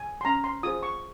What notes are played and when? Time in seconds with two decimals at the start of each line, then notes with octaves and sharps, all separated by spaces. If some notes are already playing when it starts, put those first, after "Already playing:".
Already playing: G#5
0.21 C6
0.25 C#4 A#5
0.44 C6
0.63 F4 G#4 C5 D#6
0.83 C#6